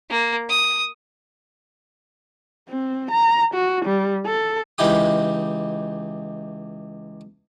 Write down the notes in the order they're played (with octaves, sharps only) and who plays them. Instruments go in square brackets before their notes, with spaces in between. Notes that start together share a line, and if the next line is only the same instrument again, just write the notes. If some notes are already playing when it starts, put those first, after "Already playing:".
[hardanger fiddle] A#3
D#6
[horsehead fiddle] C4
A#5
F#4
G3
A4
[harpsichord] C#2 E3 D#4 E4 G4 D#6